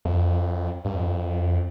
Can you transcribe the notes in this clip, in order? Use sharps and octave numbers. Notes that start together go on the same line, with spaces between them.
F2
G2
F2